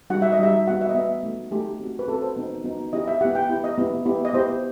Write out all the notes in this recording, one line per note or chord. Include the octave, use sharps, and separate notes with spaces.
G3 D#4 F#4 F#5
E5
D#5
G3 D#4 F#4 E5
B3 F#4 F#5
E5
D#5
B3 F#4 E5
A3 D#4 F#4
A3 D#4 F#4 G4
C4 F#4
B4
C4 F#4 A4
C5
B3 D#4 F#4
B3 D#4 F#4
B3 E4 G4 D#5
E5
B3 E4 G4 F#5
G5
B3 E4 G4
D#5
B3 E4 G4
B3 E4 G4
D#5
B3 E4 G4 C5